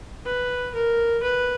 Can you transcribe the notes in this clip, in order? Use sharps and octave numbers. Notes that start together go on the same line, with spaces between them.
B4
A#4
B4